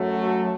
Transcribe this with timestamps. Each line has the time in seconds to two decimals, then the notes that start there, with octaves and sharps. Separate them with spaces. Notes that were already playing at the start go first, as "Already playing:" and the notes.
Already playing: F#2 F#3 A3
0.17 F#4